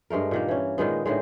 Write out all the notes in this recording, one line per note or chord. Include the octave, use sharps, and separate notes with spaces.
G2 G#3 A3 A#4
A#2 D#3 A#3
E3 C#4
A#2 D#3 G#3 B3
A2 D3 D#3 G#3